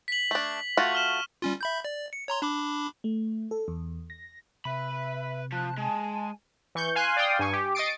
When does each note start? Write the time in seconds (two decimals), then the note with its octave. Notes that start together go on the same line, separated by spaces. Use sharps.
0.08 B6 F#7
0.31 A3 D4
0.77 A3 F4 F#4
0.92 C#6 F6 E7
1.42 G3 C#4 F4
1.61 E5 B5 G6
1.85 D5
2.13 C#7
2.28 C#5 A#5 C6
2.42 D4 B5 D6
3.04 A3
3.51 A4
3.68 E2
4.10 A#6
4.65 C3 B4 E5 B5
5.52 F3 C5 A5 F#6
5.78 G#3 G#5 A5
6.75 E3 C#6 G6
6.95 F5 G#5 C6 F#6
7.17 D5 F5 G5 C6 D#6
7.39 G2 G#5 C#6
7.53 G4
7.75 D#5 C#6 D#6 A6 C7 D7